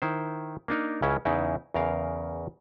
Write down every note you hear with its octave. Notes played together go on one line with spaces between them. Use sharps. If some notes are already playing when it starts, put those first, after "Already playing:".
D#3 E4 C5
A#3 D4 D#4 A#4
C#2 C#3 C#4 E4
E2 C#3 D#4 E4
E2 C#3 A#4 F5